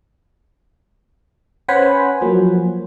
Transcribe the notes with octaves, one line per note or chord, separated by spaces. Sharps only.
C#4 B4 C5 F#5 G#5 B5
F3 F#3 A#3